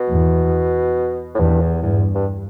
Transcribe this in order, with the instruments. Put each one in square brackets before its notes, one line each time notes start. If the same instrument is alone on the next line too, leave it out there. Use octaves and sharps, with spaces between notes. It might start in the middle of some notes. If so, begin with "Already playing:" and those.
Already playing: [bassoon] B2
[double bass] E2
[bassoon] A2
[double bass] E2 [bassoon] G2
[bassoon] E2
[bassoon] E2 [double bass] G2
[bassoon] G2